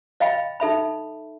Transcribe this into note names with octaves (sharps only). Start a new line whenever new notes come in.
D#5 F5 G5 B5
D#4 A4 E5 B5